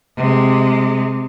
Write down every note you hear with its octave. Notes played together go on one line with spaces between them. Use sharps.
C3 G#3